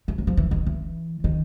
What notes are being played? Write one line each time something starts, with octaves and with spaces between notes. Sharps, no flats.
E3
F#3
F3
E3
D#3
E3
D#3